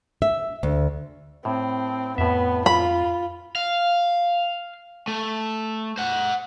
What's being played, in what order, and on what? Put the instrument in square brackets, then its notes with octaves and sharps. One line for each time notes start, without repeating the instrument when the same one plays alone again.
[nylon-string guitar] E5
D2
[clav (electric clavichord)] A2 [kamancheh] C4
[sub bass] F2 [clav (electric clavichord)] A2 E5 [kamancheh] B3
[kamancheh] F4 [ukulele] B5
[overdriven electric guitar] F5
A3
C5 F#5